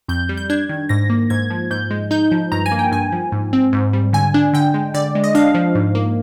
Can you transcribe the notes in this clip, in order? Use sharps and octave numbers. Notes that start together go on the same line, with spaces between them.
F2 G6
G3
G6
D4 G#6
D#3
G#2 A#6
A#3
G#2 G#6
F3
G#2 G6
G#3
D#4 G6
F3
G2 A#5
G#5
A#3
G5
G2 G#5
F3
G#2
C4
G#2
G3
D3 G#5
D4
D3 G5
G#3
D3 D5
G#3
D#5
D4 F5
F3
G#2
A#3